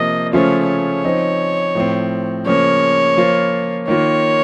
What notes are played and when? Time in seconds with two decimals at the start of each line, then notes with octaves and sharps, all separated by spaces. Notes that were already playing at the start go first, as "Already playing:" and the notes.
Already playing: C3 F3 A#3 D#5
0.33 C#3 F3 A3 C#4 F4 C#5
0.68 C#5
1.04 F3 C4 D#4
1.75 A2 F3 C4
2.46 C#3 F3 A#3 C#5
3.17 F3 A#3 F4
3.88 D#3 A#3 F4 C#5